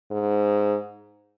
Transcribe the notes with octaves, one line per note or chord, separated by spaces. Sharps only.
G#2